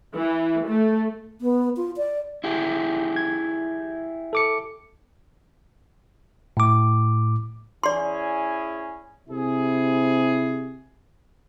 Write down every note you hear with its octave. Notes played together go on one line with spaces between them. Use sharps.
E3
A3
B3
F4
D5
E4 G4 G#4
G#6
A4 D6 C#7
A2 D6
C#4 E4 G#4 D5 C6
C3 E4 G#4